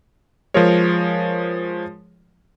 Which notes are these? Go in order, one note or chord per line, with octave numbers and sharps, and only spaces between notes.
F3 G#3 F4 G#4 A#4 C#5